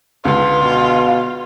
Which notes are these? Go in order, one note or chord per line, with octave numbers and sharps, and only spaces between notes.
C#2 D3 F4 B4
B2 F5